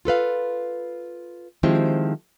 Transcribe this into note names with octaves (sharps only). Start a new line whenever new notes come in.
F4 A4 B4 F5
D#3 F3 G#3 C4 E4 G4